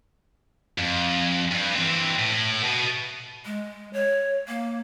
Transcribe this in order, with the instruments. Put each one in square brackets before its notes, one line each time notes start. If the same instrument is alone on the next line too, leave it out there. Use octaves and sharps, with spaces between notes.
[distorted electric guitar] F2
G2
E3 C4
A2
B2
[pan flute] G#3
C#5
A#3